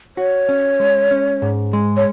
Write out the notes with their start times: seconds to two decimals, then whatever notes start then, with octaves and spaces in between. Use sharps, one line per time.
0.17 F#4 C#5
0.49 C#4
0.80 G#3
1.11 C#4
1.42 G#2
1.73 G#3
1.97 C#5